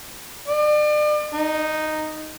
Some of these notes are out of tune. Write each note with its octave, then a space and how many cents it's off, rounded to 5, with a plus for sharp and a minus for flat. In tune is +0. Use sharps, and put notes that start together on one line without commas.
D5 +40
D#4 -5